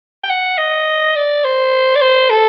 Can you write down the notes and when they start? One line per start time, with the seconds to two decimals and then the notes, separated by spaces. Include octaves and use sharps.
0.24 G5
0.29 F#5
0.58 D#5
1.16 D5
1.44 C5
1.96 D5
2.01 C5
2.30 A4